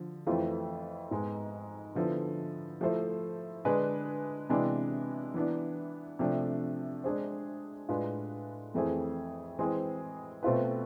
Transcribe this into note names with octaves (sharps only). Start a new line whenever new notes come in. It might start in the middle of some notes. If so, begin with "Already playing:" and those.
Already playing: D3 F3
F2 E3 A3 C4 F4
G#2 G#3 B3
D3 F3 B3 E4 A4
F3 A3 E4 A4 C5
D3 G#3 D4 G#4 B4
C3 E3 G#3 B3 D4
E3 B3 D4
C3 F3 A3 D4
G#3 D4 G#4 C5
A2 G#3 D4 F4 B4
F2 E3 A3 C4 G#4
E3 G#3 C4 G#4 C5
B2 A3 C4 F4 B4